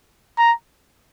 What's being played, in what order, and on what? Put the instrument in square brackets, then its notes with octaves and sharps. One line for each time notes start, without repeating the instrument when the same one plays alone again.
[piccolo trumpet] A#5